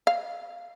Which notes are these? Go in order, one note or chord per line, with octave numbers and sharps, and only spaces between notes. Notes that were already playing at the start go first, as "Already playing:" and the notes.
F5